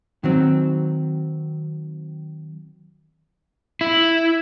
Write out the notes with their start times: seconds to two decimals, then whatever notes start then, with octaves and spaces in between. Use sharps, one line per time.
0.24 D#3 F#3 C4
3.81 E4